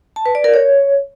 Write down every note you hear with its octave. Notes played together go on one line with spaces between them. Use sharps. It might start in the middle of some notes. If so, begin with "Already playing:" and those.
A5
B4
D5
A#4
C#5